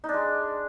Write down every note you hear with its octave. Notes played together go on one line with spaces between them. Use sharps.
D#4
D4
G#3